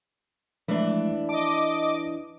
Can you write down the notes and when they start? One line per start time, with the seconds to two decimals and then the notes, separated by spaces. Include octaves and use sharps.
0.68 E3 F3 G#3 A3 D4
1.29 D#5 A5 D6